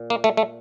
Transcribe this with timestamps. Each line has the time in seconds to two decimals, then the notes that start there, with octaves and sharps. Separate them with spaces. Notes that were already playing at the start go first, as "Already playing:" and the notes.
Already playing: A#2
0.10 A#3
0.24 A3
0.37 A3